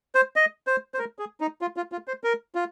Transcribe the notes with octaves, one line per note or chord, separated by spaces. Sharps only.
C5
D#5
C5
C5
A#4
G#4
D#4
F4
F4
F4
C5
A#4
F4